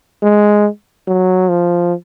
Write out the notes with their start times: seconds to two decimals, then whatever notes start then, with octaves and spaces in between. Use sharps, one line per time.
0.23 G#3
1.07 F#3
1.49 F3